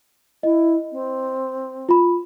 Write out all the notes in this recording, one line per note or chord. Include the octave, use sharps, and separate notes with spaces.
E4 D#5
C4
F4 B5